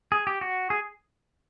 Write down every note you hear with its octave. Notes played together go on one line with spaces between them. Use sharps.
G#4
G4
F#4
G#4